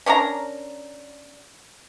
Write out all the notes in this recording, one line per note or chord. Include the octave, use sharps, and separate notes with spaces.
C#4 D4 A#4 A#5